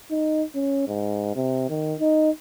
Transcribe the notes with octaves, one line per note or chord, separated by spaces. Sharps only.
D#4
C#4
G#2
C3
D#3
D#4